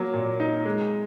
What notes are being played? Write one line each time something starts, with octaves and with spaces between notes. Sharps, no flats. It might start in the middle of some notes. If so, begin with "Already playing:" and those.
Already playing: F#3 A#3
A#2
D#4
G#3